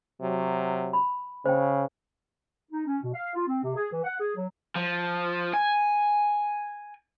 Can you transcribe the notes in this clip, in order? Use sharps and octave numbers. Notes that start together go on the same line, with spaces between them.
C3 F#3
B5
C#3 C5 G5
D#4
C#4
B2
F5
F4
C4
C3
G#4
E3
F#5
G#4
F#3
F3
G#5